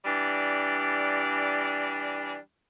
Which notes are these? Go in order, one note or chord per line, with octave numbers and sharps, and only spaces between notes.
E3 G3 D4